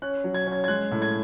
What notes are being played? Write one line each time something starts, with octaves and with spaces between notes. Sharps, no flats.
C#4 F#6
F#3
G#6
C#4
G#6
G#6
G#3 F#6
A2
G#6